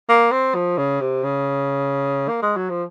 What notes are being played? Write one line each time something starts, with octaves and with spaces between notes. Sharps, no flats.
A#3
C4
F3
C#3
C3
C#3
A#3
G#3
F#3
F3